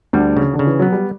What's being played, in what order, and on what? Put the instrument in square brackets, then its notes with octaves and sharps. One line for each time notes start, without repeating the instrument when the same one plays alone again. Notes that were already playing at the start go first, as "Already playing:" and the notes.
[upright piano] D2 D3 [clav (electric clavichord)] G3
[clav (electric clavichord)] C#3
[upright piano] D3
[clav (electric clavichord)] C#3
[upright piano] E3
[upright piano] F#3 [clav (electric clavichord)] B3
[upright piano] G3